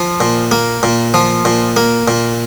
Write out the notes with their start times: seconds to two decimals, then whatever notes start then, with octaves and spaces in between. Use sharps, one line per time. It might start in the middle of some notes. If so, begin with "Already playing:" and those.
Already playing: F3
0.20 A#2
0.51 A#3
0.83 A#2
1.14 F3
1.45 A#2
1.77 A#3
2.08 A#2